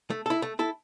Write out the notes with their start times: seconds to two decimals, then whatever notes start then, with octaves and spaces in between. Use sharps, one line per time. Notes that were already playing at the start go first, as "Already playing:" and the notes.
0.10 A3
0.26 E4 A4
0.42 A3
0.59 E4 A4